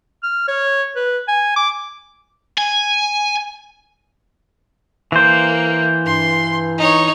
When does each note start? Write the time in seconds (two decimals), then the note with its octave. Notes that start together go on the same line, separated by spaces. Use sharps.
0.23 F6
0.48 C#5
0.96 B4
1.28 G#5
1.56 D6
2.58 G#5
5.12 E3 A#3 C5
6.06 G2 C6
6.78 D#4 C#5